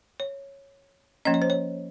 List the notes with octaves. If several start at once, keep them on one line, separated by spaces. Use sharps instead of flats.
C#5
F3 A#3 C#4 D#5
C#5
C5
C#5